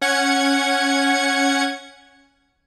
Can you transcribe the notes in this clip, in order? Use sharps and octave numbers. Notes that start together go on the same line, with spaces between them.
C#4 F#5 G#6 C#7